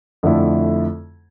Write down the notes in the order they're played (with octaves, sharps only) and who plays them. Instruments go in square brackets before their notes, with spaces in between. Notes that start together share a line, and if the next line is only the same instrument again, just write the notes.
[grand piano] F2 D3 A3 E4